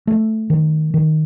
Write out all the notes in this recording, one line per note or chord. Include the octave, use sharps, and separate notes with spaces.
A3
D#3
D#3